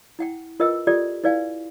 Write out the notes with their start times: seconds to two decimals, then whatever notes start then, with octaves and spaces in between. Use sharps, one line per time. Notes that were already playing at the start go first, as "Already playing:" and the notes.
0.19 E4 F#5 G5
0.60 F4 A#4 B4 D#5 G5 E6
0.87 F4 G4 A4 D5
1.24 E4 B4 D5 F5 G#5